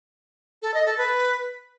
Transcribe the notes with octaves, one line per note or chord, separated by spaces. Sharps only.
A4
D#5
A4
B4